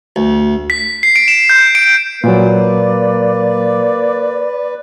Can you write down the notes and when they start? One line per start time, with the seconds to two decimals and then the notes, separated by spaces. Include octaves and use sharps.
0.16 D2
0.70 B6
1.03 C7
1.16 D7
1.28 E7
1.49 G6
1.75 D7
2.24 A#2 F#3 A#3 B4 D5